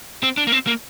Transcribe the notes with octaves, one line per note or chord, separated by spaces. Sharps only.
C4
D4
A#3
C4
A#3